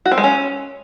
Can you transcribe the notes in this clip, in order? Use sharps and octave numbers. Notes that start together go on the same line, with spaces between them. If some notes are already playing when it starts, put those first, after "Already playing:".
F#4
C4
G#3
C#4